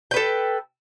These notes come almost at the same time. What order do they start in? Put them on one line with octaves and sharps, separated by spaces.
G5 B4 A4